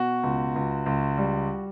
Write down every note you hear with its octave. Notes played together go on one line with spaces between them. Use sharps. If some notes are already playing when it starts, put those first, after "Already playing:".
Already playing: B2 F#4
C#2
C#2
C#2
G3